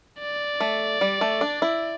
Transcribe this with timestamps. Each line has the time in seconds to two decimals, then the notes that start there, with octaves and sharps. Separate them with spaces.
0.21 D5
0.60 A3
1.01 G3
1.21 A3
1.41 D4
1.62 E4